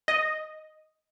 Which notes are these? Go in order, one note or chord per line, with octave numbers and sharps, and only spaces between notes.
D#5